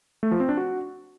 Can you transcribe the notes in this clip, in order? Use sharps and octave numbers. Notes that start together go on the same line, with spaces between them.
A3
F3
C4
D4
F#4